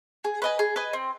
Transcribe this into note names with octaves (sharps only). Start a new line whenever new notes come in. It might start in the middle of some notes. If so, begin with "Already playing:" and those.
G#4
B4 D#5 G#5
G#4
B4 D#5 G#5
C4